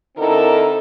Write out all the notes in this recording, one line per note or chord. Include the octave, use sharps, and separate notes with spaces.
D3 C4 D#4 E4 A4 A#4